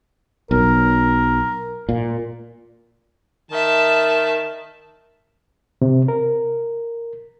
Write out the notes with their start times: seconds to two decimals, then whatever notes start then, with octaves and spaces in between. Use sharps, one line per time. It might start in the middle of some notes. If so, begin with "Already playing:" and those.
0.51 B1 A#4
1.89 A#2
3.51 D#3 E5 A5
5.82 C3
6.08 A#4